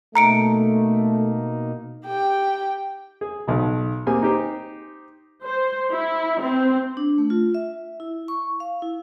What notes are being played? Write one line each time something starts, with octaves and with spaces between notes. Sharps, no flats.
B2 A3 A#3 D#4 A#5 C#7 D7
G4 G5
G#4
B1 B2
A#3 C4 G4 G#4 G#5
D#4 G4 C5
C5
E4
C4
D4
A3
F4
E5
E4
C#6
F5
E4